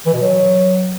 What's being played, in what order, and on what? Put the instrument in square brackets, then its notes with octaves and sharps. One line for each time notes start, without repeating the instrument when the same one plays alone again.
[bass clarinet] E3
B2
F#3